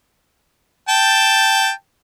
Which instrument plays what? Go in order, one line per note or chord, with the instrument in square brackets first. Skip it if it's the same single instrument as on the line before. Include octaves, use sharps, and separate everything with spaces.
[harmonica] G5 A5